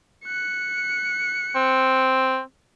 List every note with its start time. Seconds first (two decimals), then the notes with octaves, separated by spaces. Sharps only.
0.25 F#6 C#7
1.55 C4